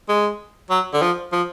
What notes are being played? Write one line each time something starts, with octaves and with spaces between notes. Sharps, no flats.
G#3
F#3
D3
F3
F3